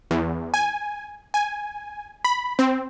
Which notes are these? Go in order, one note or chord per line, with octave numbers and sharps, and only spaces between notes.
E2
G#5
G#5
B5
C4